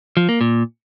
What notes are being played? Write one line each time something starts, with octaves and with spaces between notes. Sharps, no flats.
F3
A#3
A#2